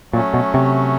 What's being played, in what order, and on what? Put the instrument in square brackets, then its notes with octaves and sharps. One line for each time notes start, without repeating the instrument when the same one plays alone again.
[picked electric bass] A#2 [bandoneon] F#3 A3 C#4
[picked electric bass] B2
C3